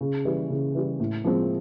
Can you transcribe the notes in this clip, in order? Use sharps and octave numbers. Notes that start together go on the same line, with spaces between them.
C#3
E3 G3
C#3
E3 G3
A2
F3 G#3 C4